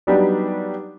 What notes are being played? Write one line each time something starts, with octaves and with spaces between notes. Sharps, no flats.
F#3 G3 B3 D4 D#4 G4